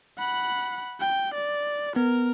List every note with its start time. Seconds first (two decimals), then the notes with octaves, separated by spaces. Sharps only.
0.18 F#5 B5
1.00 G5
1.34 D5
1.96 B3 A#4